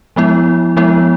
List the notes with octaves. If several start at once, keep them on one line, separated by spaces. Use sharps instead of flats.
F3 G#3 B3 E4
F3 G#3 B3 E4